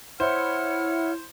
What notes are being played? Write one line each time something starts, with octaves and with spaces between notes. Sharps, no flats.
E4 C5 C#5 F#5 F6